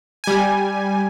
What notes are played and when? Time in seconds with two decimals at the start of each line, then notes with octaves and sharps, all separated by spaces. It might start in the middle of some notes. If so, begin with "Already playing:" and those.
0.24 G3 G#5